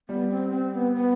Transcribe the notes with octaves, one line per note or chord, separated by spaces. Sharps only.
G3 B3
C4
C4
B3
B3